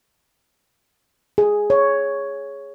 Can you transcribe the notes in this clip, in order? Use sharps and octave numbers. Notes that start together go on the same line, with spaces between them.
G#4
C#5